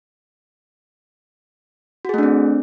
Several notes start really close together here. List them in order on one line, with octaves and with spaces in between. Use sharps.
F#4 G#4 A3 D4 C4